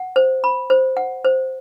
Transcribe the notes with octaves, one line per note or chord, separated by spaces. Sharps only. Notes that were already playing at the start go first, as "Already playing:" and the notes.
Already playing: F#5
C5
B5
C5
F#5
C5